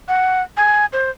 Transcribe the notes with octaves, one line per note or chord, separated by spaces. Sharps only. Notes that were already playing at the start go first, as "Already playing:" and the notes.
F#5
G#5
C5